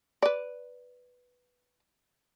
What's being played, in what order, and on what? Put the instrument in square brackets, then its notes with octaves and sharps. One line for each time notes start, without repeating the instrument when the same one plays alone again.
[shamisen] B4 D5